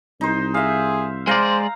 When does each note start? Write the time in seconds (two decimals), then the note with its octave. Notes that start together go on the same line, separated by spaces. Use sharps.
0.21 C2 D#4 C5
0.54 G#4 E5 F5
1.27 G#3 C5 D5 F5 A#5